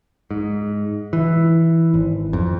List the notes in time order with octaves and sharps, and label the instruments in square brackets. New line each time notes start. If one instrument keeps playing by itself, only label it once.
[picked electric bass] G#2
E3
G#1
F2